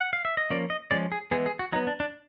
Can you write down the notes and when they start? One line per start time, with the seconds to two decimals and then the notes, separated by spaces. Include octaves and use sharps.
0.00 F#5
0.13 F5
0.25 E5
0.37 D#5
0.50 F3 A#3 C#4 D5
0.70 D#5
0.91 F3 G#3 C#4 D5
1.12 G#4
1.31 E3 G#3 B3 G#4
1.46 G#4
1.59 F#4
1.73 F#3 D#4
1.76 B3
1.87 D4
2.00 D4